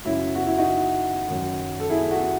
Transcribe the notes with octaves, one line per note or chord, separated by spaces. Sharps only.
F#2 C#3 F#3 E4
F#4
E4
D#4 F#4
F#2 D#3 F#3
A4
E4 G#4
F#4 A4